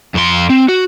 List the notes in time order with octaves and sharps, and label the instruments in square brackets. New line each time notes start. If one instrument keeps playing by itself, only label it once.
[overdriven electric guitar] F2 C6
C4
F#4